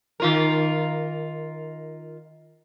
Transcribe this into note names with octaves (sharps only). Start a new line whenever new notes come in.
D#3 F4 A#4